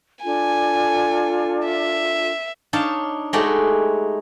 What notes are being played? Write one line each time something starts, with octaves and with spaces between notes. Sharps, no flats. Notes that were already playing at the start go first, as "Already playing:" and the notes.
D4 F4 A4 G#5
E5
D4 D#4 C#5 F5 A5
G#3 A3 D#4 F#4 G4 D5